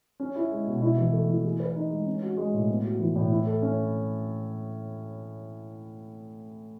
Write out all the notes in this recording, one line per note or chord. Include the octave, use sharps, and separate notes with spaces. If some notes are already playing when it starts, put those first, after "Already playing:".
C#4
E4
G#3
B2
E4
E3
A3
E3
G#4
B4
D#4
G#3
C#4
F#4
G#3
A2
B3
F#4
E3
A2
E4
A4
C#4